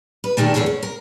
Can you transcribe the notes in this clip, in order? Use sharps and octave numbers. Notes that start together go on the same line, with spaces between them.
B4
A#2 D3 D#3 A3 D4 G4
E2 A3 E4 G#4 C#5
C#4
A#4